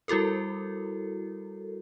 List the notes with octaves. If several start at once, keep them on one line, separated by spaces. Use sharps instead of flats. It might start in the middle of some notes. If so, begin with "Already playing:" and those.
G3 E4 F#4 A4 A#4